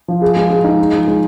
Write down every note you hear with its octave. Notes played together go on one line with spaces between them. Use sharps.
F3
G#4
G#3
G#3
D#4
G#4
F3
G#3